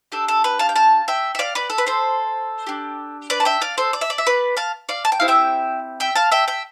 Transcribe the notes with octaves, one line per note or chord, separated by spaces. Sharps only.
D4 G4 A4
A4
B4
F5 A5
G5
F5 A5
E5 G5
E5
D5 F5
B4 D5
A4
B4
A4 C5
D4 G4
B4 D5
A5
E5 G5
D5 F5
A4 C5
D5
E5
D5
E5
B4 D5
F5 A5
D5 F5
A5
G5
C4 E4 G4 F5
E5 G5
E5 G5
F5 A5
E5 G5
E5 G5